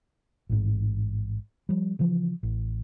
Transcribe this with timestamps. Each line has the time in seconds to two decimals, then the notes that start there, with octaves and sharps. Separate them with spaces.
0.50 A1 G#2
1.69 F3 G3
1.99 C#3 E3 F3
2.43 A1